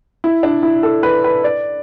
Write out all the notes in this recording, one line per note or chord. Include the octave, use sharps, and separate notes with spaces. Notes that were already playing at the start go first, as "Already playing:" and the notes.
E4
D4
E4
A4
B4
B4
D5